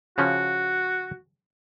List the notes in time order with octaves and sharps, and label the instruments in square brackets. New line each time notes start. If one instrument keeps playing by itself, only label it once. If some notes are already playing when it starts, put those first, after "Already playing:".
[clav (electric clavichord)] C#3 F3 C#4 [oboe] F#4